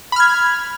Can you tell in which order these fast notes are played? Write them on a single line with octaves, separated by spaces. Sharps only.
B5 F6 G#6